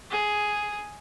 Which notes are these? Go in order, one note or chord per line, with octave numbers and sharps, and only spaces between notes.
G#4